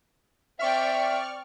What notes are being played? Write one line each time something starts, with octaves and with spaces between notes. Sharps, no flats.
C4 D5 E5 G5 C#6 F6